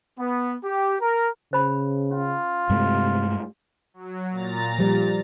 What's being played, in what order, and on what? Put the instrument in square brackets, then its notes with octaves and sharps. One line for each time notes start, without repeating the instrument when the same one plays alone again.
[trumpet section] B3
G4
A#4
[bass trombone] C#3 [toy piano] C5 B5
[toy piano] C#4 [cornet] F4
[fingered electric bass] G2 G#3 A3 [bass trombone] C3
[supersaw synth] F#3
A#2 A#5 A6
[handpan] F3 G3